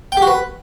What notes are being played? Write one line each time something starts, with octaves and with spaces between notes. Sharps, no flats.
G5
G4
F#4
B4